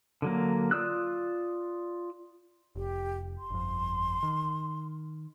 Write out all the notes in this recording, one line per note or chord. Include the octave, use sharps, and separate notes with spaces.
D3 F#3 A#3
F4 D5 D#6 E6 F#6
F1 G4
C6
G1 F2
D#3